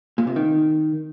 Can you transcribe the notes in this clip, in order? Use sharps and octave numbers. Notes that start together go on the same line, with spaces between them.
A#2
C3
D#3